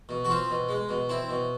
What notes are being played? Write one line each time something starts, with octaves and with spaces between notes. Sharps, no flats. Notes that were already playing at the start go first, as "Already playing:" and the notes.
B2
F#4
C4 F4
B2
G#3
B2
C4 E4
B2